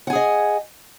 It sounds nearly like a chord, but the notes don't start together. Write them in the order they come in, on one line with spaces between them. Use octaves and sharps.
F#5 G#5 G#4 D#5